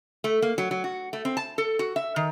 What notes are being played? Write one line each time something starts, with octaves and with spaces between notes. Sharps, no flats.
A3
A#3
F#3
F#3
F#4
A3
C4
A5
A4
F#4
E5
D#3